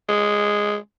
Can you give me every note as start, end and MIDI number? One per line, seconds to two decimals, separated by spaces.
0.09 0.76 56